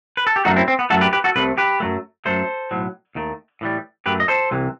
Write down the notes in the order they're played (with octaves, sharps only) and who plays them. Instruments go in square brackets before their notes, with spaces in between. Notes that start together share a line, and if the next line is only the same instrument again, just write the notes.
[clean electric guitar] B4
A4
G4
F#2 F#3 A3 D#4 F#4
C4 E4
C4
B3
F#2 F#3 A3 F#4 A4
G4 B4
G4 B4
F#4 A4
C2 C3 A3 B4
G4 B4
F#2 F#3 A3
F#2 F#3 A3 A4 C5
B1 A2 F#3
D#2 D#3 A3
A2 E3 G3
F#2 F#3 A3 G4 B4
D#5
A4 C5
C2 C3 E3